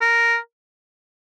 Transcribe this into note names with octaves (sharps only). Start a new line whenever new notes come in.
A#4